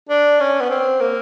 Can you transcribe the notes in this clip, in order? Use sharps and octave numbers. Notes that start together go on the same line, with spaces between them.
D4
C#4
B3
C4
A#3